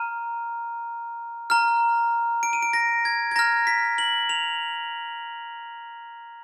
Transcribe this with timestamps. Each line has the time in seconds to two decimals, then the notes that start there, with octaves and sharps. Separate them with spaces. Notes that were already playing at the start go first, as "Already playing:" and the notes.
Already playing: A#5 F6 D#7
1.50 A#5 F6
2.43 D7
2.53 D#7
2.62 D7
2.73 A#6
3.05 G#6
3.31 G#6
3.36 A#5 F6 A#6
3.67 B6
3.98 F#7
4.29 F7